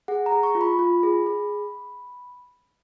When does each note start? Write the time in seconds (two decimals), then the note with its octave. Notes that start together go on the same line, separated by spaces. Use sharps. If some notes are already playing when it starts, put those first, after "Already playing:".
0.08 G#4 F#5
0.26 A#5
0.32 G#4
0.43 C#6
0.55 F4
0.61 B5
0.79 F4
1.03 G#4
1.26 G#4